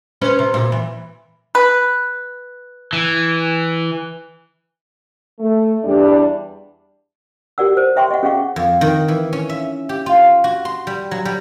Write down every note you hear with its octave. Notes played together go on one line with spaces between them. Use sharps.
C#4 B4 C5
C3
A#2
E3
B4
E3
A3
E2 G3 D4
G4 A#4 D5 F#5 E6
C5
C#5 E5 G5 C6 C#6
D#5 F#5
C#4 G#4 D#5 F5 F#5 C#6
F2
D#3
E3
C#4
E5
G4
F4
F#4
C6
G3
F#3
G3